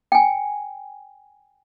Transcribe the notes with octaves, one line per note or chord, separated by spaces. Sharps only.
G5 G#5